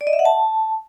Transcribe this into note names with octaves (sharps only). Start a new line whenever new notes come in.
D5
D#5
E5
F#5
A5